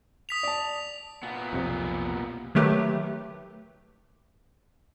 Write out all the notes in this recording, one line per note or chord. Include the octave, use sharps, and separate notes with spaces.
D#6 B6 F7
D5 A5
A#2 B3
B1 F2 C3
D#3 F#3 A3 G4 B4